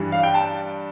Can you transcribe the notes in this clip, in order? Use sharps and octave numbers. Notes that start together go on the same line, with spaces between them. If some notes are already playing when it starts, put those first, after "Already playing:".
Already playing: G2 E3 G3
F5
G5
A5